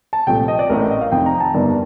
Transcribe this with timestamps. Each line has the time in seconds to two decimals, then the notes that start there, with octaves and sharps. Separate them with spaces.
0.13 A5
0.27 C2 A#2 F3 A3 G5
0.48 D#5
0.59 D5
0.70 A1 A2 A3 A#4
0.91 D#5
1.01 F5
1.12 F1 F2 D#3 G5
1.26 A#5
1.40 A5
1.54 G1 G2 D#3 G3 A#4